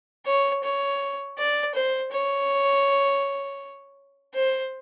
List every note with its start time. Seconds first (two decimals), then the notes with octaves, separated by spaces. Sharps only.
0.26 C#5
0.64 C#5
1.38 D5
1.75 C5
2.12 C#5
4.35 C5